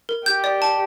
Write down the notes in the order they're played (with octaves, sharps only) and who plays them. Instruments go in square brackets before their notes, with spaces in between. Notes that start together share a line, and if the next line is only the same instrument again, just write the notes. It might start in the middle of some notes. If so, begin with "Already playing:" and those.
[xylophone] A#4
[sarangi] G4 [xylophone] G6
[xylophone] D5
A5